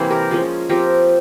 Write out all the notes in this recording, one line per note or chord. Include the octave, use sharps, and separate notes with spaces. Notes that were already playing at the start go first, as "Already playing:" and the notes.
Already playing: C3 E3 G3 A#3 C4 C5
G4 A#4
F3 G#3 C#4
F3 C4 G4 A#4